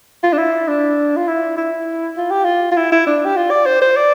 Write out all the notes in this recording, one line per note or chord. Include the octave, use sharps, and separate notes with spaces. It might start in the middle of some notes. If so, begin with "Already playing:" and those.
F4
D4
E4
D4
F4
E4
E4
F4
G4
F4
F4
E4
E4
D4
G4
F4
D5
C5
C5
D5